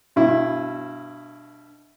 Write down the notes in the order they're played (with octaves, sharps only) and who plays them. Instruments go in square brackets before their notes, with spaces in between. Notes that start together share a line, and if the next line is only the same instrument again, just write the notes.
[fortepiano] G2 B2 E4